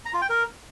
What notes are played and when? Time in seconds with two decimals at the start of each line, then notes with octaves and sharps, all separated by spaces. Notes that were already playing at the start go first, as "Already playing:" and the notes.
0.05 A#5
0.13 F4
0.21 G5
0.29 A#4